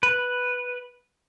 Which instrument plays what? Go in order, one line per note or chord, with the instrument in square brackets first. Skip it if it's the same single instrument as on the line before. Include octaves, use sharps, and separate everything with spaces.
[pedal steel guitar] B4